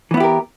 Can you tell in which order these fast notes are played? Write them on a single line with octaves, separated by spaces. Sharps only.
E3 B3 E4 G4 A#4